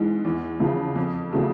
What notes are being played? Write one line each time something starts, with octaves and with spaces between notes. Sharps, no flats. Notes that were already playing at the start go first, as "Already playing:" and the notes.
Already playing: G#2 E3 G#3
E2
C#3 F3
F2
C#3 F#3 A3